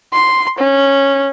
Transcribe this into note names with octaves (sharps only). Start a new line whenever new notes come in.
C6
C#4